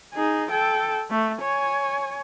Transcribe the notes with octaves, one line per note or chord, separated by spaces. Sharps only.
D#4 G#4
A4 G5
A3
C#5 G#5